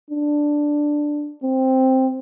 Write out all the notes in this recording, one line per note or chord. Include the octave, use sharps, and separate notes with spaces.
D4
C4